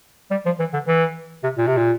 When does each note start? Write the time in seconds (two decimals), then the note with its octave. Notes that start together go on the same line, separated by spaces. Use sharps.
0.31 G3
0.46 F3
0.60 E3
0.73 D3
0.88 E3
1.44 C3
1.58 A#2
1.67 C3
1.77 A#2